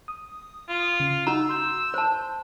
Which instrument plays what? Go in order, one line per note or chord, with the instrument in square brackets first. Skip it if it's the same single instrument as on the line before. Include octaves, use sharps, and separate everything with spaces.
[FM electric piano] D#6
[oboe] F4
[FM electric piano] C#3
[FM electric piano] D#4 F#4 [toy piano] A#5 [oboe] E6
[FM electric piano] C6 G6
[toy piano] C5 A5